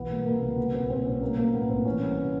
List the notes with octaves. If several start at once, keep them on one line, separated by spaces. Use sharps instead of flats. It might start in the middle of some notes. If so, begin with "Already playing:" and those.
Already playing: B1 E3 B3
G3 A#3
C3 A#3
C#2 B3
G3 B3
B1 C4
A#2 C4
B1 C#4
F#3 A#3
A3 A#3
A2 B3
A#1 C4
E3 C#4
G3 B3
C3